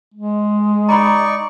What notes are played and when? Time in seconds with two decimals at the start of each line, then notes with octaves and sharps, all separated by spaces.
0.14 G#3
0.89 D#4 D5 A#5 B5 C#6